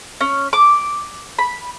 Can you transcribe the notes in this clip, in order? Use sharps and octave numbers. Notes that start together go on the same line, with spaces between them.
C#4
D6
B5